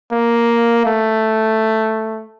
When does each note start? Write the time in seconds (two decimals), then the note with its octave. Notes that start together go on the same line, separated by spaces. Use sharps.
0.12 A#3
0.86 A3